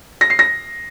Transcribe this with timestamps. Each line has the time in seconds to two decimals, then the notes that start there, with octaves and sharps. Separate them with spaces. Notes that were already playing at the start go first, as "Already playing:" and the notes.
0.21 A#6
0.30 C7
0.39 A#6